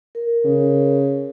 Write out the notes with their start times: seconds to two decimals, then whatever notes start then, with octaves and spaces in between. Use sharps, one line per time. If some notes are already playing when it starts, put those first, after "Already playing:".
0.15 A#4
0.45 C#3